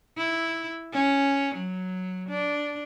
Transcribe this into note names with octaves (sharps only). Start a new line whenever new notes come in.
E4
C#4
F#3
D4